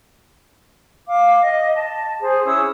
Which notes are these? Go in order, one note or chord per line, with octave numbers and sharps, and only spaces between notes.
F5 D6
D#5
A5
G#4 C5
C#4 E4 D#6 E6